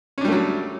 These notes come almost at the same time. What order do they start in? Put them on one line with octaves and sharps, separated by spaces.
C#4 D4 G3 A3 F#3